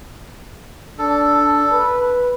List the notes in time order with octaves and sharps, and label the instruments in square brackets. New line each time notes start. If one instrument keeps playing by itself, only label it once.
[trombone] D4 [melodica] A4
[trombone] B4